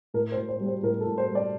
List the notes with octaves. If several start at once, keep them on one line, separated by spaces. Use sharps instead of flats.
A2 A#4
C5
A2
C5
G3
C5
A2 A#4
A4
A2
C5
G3
D5